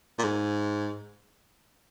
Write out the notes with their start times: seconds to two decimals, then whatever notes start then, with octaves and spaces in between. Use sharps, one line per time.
0.19 A#2
0.24 G#2